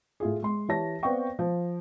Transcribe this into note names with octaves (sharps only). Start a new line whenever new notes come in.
A2 F4 G#4
G#3 C6
E3 G4 C#5 A5 A#6
B3 C4 D5 F5 G5 C#6
F3